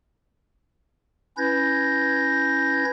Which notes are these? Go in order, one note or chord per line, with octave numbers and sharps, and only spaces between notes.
C#4 E4 B4 G6 G#6 A#6